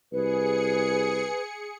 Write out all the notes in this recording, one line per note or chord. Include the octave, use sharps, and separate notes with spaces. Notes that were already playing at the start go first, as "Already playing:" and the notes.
C2 G#4 B4 C#7